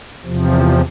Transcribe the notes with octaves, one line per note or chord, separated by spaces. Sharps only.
E2 C3 F3